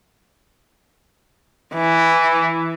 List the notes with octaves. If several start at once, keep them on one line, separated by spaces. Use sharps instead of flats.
E3